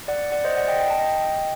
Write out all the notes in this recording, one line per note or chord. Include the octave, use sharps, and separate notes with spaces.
D5 F#5
D5 F#5
C5 D#5
D5 F#5
D#5 G5
G5
A5
D#5 G5